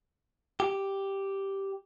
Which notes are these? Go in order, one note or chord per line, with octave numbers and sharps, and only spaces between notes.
G4